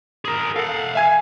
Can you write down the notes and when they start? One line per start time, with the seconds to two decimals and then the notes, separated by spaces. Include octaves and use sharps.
0.25 G#4 A#4
0.56 A4 F5 F#5
0.95 E5 G#5 G#6